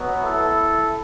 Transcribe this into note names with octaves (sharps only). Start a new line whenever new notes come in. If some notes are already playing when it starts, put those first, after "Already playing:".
Already playing: B2 F#3 B3
E4 A4